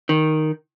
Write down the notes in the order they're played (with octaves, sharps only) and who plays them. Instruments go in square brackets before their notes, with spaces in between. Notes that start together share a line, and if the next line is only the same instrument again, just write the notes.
[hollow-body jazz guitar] D#3